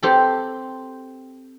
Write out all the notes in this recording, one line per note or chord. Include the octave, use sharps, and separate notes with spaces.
C4 G4 A4